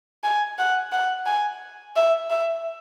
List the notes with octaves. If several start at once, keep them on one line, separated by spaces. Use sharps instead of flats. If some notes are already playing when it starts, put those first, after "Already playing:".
G#5
F#5
F#5
G#5
E5
E5